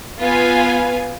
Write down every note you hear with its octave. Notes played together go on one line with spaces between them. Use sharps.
B3 F4 B4 F5 G#5